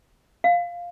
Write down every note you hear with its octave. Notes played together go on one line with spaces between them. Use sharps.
F5